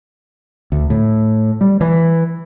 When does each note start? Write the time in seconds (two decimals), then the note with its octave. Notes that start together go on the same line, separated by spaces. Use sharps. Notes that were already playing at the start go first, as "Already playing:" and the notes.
0.72 D2
0.90 A2
1.61 G3
1.81 E3